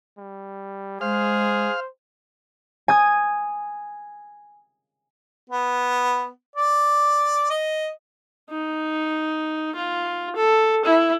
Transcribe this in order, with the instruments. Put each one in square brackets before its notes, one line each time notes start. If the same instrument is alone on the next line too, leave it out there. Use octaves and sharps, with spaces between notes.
[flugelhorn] G3
[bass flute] G#3 [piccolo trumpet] G#4 [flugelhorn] C5 [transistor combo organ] F5
[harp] G#5 D#6 G#6
[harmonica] B3
D5
D#5
[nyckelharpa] D#4
F4
A4
E4